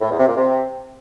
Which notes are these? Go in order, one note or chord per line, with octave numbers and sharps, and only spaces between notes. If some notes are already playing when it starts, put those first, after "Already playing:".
A2
E2
C3
A#2
C3